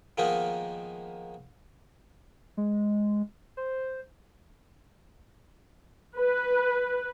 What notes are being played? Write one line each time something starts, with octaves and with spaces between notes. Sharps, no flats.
D#3 F3 G#3 A#3 B3 D#4
G#3
C5
B4